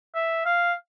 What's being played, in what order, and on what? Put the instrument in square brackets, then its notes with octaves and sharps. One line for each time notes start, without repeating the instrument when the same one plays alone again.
[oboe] E5
F5